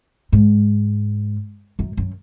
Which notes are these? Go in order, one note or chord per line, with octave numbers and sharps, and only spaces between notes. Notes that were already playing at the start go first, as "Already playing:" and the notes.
G#2
F#2
F#2